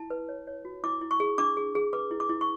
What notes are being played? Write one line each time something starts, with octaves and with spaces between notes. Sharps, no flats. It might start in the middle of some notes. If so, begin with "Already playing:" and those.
Already playing: E4 A5
B4
C#5
C#5
F#4
E4 D6
E4
C#6
G#4
D4 D6
G#4
G#4
B4 D6
E4
D6
E4
C#6